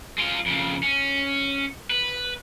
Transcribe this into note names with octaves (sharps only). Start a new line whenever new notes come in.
G#3 F4
F2 C#3
C#4
B4